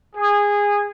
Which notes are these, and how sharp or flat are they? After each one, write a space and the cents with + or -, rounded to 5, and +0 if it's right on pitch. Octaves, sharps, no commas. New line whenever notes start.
G#4 -20